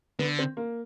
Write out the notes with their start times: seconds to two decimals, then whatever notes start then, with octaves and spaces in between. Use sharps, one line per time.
0.19 D3 B3
0.39 C4
0.57 A#3